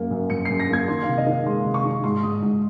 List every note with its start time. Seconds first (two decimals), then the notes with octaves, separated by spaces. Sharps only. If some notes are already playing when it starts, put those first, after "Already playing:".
Already playing: F#2 A#3
0.11 F#2
0.30 F#2 C#7
0.45 C7
0.50 F#2
0.60 A#6
0.69 A#3 G#6
0.88 D#3 C6
1.03 F5
1.08 C3
1.18 D#5
1.27 D#3
1.32 F5
1.46 G#3 C6
1.65 C3
1.74 C#6
1.84 D#3
2.04 G#2 C6
2.23 G#2 D#6
2.42 G#2